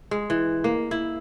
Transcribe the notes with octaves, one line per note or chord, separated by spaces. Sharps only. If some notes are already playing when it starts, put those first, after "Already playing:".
G#3
E3
A#3
E4